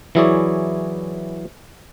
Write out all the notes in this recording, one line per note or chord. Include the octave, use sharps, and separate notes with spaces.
E3 F#3 E4 G#4 C#5 D5